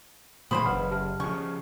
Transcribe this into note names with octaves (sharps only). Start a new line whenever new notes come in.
A#2 C#3 E3 F#3 C5 B5 C6 D#6
F#1 B4 F#5 F6
G4 A5 F6
C#3 F3 C#6